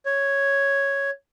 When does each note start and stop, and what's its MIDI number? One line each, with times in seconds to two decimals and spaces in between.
0.06 1.10 73